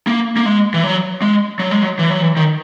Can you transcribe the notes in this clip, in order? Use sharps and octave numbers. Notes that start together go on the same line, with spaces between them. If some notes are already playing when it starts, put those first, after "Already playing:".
A#3
A#3
G#3
E3
F#3
G#3
F#3
G#3
F#3
E3
F#3
E3
D#3